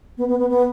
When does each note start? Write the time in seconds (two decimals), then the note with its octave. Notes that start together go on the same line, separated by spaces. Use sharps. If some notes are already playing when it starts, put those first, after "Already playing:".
0.17 B3
0.28 B3
0.38 B3
0.49 B3